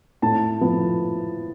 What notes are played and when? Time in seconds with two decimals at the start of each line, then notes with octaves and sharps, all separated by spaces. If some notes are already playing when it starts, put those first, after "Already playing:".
0.22 A2 A5
0.61 F3 B3